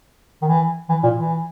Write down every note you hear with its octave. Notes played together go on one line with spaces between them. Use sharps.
D#3
E3
E3
A#2
E3